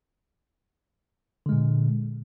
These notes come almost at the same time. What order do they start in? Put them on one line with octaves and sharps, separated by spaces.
D3 G#3 A#2